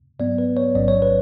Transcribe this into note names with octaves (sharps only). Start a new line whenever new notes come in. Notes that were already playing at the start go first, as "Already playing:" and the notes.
G#2 F#3 B3 D5
B4
C#5
A1 G#2 F#3 C#4 D5
C#5
B4